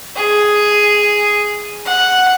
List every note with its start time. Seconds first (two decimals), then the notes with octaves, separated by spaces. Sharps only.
0.16 G#4
1.86 F#5